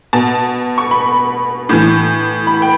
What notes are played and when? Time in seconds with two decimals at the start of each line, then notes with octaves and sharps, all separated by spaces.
0.13 B2 A5
0.78 C#6
0.91 B5
1.69 A2 E3
2.47 B5
2.62 G5